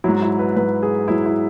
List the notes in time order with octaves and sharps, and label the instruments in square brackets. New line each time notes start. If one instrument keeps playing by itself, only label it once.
[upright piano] G#2 F#3 E4
E4
B4
G#2 F#3 B4
G#4
G#2 F#3 E4
E4